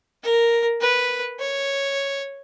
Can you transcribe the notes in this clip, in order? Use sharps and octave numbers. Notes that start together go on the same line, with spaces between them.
A#4
B4
C#5